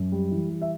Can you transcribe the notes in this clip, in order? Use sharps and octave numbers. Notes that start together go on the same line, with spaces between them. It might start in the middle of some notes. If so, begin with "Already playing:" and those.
Already playing: F#2
G3
E3
G3
E5